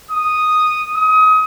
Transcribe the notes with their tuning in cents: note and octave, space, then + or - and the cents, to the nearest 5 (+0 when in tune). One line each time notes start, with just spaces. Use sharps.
D#6 -5
D#6 +30